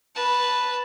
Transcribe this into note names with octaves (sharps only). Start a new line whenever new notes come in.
B4 A5